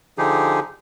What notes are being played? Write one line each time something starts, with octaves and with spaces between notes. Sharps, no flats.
D3 F3 D#4 G4 G#4